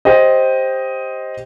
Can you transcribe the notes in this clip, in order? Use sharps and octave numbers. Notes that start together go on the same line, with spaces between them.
G4 C5 D#5